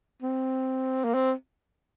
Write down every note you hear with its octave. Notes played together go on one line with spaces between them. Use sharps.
C4
A#3
C4